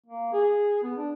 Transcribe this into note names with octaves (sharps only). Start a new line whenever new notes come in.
A#3
G#4
B3
D4